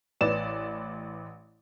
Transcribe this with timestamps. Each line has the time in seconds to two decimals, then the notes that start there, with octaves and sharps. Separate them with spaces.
0.21 A1 B4 D5 E7